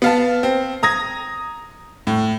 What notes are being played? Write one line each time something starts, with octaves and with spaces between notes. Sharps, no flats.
B3 F5 A5
C4
A#5 D#6 G#6 A#6
A2